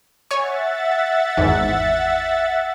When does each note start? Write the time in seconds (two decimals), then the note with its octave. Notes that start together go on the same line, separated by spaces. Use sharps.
0.31 C#5 E5 F#5 G#5 C#6 A6
1.37 G#1 E2 G#2